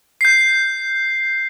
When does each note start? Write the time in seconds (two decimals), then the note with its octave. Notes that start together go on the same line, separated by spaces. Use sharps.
0.21 G6 C7